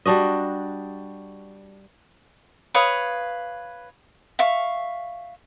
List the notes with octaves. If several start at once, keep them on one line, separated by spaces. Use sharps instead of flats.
G3 D4 F#4 D#5
B4 C#5 F5 D#6
E5 F5 C#6